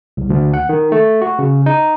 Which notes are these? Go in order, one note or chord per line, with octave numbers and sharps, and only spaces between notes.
C2
D2
F#5
D#3
A3
F#4
C#3
D#4